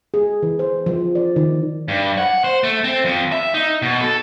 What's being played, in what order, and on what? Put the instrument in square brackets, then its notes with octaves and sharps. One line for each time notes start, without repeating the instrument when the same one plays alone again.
[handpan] G#4
E3
C5
F3
D5
D#3
[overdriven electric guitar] G2
F#5
C5
A3
C4
F2
E5
D#4
B2
A4